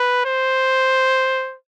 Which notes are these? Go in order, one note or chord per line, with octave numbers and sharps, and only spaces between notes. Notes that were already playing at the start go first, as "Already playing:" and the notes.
Already playing: B4
C5